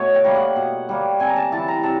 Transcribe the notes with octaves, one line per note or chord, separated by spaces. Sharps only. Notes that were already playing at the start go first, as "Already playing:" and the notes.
Already playing: B2 A3 C#5
G5
G3 A#3
F#5
B2
G3 A#3
C3 G#5
A#5
A5
E3 G3 A5
A#5
C3 A5